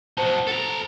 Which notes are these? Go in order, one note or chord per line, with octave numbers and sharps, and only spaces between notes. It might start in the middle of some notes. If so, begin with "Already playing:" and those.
D#4 F#4 C5 A5
A4 A#5